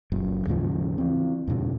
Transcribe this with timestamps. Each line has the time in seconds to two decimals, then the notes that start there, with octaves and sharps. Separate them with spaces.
0.12 F#1 F#2 A#2
0.47 D#2 G#2 C#3 F3
0.98 E3 C4
1.47 E2 G2 A#2 C#3